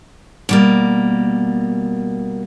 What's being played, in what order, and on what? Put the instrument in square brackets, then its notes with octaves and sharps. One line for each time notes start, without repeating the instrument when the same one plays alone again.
[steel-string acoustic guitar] B2 G3 A#3